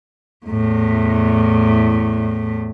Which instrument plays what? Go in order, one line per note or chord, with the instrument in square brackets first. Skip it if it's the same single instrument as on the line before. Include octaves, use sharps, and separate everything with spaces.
[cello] E2 A2